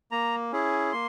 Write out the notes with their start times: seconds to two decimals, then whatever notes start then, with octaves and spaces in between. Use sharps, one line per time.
0.11 A#3 A#5
0.52 C#4 E4 G#4
0.93 A#3 C6